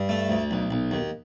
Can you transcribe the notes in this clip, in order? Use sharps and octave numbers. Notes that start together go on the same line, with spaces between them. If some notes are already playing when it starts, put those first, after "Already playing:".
Already playing: G2
A3
D2
B1
B1
D#2